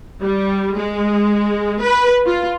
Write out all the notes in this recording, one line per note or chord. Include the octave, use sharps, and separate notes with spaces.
G3
G#3
B4
F4